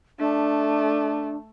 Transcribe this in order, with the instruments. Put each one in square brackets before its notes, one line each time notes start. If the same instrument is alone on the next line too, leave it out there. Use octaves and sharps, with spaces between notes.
[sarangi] A3 [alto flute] D4